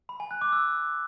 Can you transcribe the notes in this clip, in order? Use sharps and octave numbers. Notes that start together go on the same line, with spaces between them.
B5
G#5
F#6
D6
E6